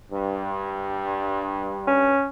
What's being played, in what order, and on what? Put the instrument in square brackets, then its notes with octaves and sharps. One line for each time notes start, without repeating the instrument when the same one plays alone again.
[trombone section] G2
[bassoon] C#4